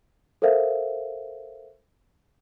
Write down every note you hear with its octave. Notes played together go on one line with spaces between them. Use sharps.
A4 A#4 C5 E5 F5